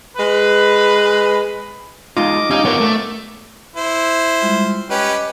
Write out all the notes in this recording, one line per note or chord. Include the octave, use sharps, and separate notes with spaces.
G#3 B4
G#3 D#4 F4 D#5 D6
C#4 D#4 G4 F5 D6
B3 F4 A#4 C#5
A3
E4 C5
G3 G#3 F4
C#4 G4 B4 D#5 D6